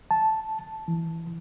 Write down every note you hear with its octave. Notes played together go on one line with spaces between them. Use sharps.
A5
E3